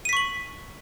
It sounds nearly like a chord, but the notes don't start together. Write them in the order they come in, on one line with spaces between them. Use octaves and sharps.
D#7 B6 C#6 F#7